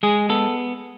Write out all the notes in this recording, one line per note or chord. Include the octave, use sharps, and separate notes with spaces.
G#3 G#4
B3 A4